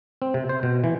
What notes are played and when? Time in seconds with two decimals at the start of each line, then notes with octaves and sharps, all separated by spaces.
0.22 C4
0.34 C3
0.49 C5
0.63 B2
0.84 E3